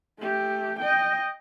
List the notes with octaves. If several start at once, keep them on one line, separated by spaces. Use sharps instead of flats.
A3 G4
D#5 G5